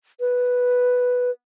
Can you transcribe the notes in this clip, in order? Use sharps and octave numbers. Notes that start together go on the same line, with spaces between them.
B4